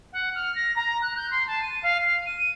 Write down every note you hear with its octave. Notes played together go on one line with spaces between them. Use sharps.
F#5
F6
A#6
A#5
F#6
G6
C6
A5
D#7
F5
F6
D#7